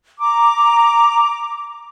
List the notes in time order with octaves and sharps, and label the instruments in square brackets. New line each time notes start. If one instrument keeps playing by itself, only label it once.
[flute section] A#5 D6